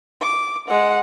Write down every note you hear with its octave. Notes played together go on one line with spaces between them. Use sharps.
D6
G#3 F#5